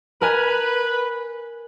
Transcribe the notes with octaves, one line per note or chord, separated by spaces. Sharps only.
A#4 B4 G#5